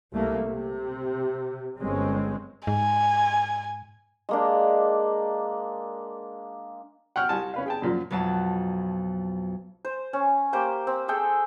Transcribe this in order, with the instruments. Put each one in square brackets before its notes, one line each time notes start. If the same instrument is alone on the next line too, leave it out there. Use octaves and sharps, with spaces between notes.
[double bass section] C2 A3 A#3
C3
G1 G#3 C4 C#4
[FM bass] G#2 [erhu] G#5
[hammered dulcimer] G#3 A#3 D4
[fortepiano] F#5 G5 C#6 F6
C2 G#5 A5
C#4 B4 F5
G#4 G5 A5
F#2 A#2 F3
[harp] B1 F2 F#3 A5
[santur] C5
C#4
A#3 G4 C5 G5
C4
G#4 A4 G5